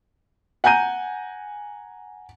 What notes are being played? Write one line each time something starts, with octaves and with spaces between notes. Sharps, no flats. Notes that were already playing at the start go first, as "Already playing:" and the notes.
F#5 G#5 A#5 G6 D#7